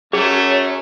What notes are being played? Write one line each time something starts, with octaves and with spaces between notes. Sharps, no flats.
F#2 A3 G#4 C#5